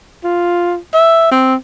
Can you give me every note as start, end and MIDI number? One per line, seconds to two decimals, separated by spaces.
0.24 0.76 65
0.94 1.28 76
1.31 1.55 60